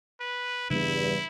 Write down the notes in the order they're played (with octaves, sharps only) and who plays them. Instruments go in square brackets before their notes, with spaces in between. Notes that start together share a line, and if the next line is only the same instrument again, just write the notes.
[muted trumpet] B4
[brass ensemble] E2 G2 [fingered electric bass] C#3 G3 B3 [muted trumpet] E4